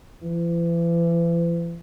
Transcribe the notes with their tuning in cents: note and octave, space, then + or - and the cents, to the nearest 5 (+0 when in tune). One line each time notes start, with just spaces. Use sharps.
E3 +40